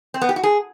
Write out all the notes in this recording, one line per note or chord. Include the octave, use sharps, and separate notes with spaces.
C4
B3
G4
F#4
G#4